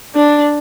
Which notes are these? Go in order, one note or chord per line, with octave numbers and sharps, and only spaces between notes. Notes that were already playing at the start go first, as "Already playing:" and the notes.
D4